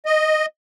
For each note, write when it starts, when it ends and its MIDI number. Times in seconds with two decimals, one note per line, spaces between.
0.06 0.46 75